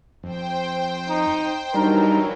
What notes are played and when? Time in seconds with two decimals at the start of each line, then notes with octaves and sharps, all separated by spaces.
0.23 F2 C5 G5
1.08 D#4
1.74 E3 F#3 G3 D4 D#4 A#4